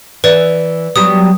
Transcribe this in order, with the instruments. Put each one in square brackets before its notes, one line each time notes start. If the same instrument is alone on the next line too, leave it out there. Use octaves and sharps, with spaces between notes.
[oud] E3 [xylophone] B4 D5
[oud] F#3 G3 B3 [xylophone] D#6